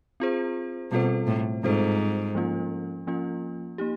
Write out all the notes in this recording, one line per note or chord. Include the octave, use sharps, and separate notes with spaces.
C4 F4 G#4 C5
B2 G3 C4 F4 A4 C5
A2
G#2 G3 C4 F4 A4 C5
F3 A#3 C#4 F4
F3 A#3 C#4 F4
A#3 D#4 G4